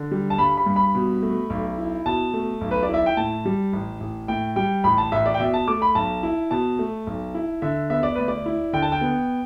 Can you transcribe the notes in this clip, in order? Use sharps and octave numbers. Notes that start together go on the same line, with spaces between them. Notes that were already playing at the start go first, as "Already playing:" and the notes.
Already playing: D3
G3
A5
G2 B5
B5
G2
B5
B2
A3
B1
E4
B2 A5
A3
B1
B4
D5
E4 E5
G5
A2 A5
G3
A1
A1
A2 G5
G3 G5
A1 B5
A5
A1 E5
D5
G5
B2 E5
A5
A3 D6
B5
B1 A5
E4
B2 A5
A3
B1
E4
D3 E5
B3 E5
D5
D2 B4
D5
E4
D3 G5
A5
G5
B3